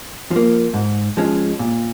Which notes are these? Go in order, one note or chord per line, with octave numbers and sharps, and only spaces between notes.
F3 A#3
G#2
F3 G#3 C#4
A#2